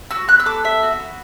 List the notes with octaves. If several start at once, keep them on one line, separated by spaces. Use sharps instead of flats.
F#4 E6
B3 F#6
E6
A4 D6
B3 E5
F#4
B3